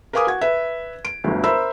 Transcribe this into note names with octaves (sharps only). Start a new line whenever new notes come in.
A#4 B4 F5 G#5 D6 D#6
F#4 G#6
B4 E5
D7
G1 D2
A#4 C5 E5 A#5 B5 E6